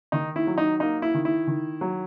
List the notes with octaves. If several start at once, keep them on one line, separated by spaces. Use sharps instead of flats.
D#3 D#4
E4
F#3
D#4
A#3 D#4
E4
D#3
E4
D#3
F#3